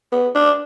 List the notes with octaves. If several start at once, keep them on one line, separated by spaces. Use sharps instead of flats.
B3
D4